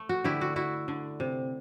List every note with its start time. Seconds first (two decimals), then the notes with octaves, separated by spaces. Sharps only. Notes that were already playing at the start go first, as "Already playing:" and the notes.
Already playing: A3
0.09 F#4
0.24 D3 E4 G4
0.41 F#4
0.56 E4 F#4
0.88 D3
1.20 C3